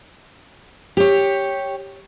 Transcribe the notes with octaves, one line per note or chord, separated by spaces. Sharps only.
G4 C#5